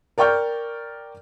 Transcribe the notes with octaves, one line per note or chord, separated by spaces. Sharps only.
A#4 D5 G5 C#6 F6 G6